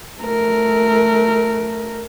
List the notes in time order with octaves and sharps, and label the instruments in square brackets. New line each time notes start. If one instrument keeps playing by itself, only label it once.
[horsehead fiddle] A3 A#4